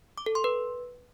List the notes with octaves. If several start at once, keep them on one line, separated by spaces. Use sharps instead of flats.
D6
A4
C6
B4